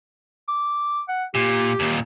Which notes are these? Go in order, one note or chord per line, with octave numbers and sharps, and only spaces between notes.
D6
F#5
A#2 G4
D#2 A#2